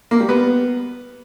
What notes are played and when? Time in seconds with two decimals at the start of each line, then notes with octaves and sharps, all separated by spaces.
0.11 A#3
0.20 G3
0.29 B3